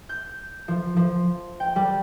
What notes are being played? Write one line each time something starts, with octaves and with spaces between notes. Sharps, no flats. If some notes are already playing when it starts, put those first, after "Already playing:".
G6
F3
F3
G5
G3